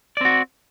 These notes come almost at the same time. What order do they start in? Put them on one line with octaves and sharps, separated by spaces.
D5 C4 F#4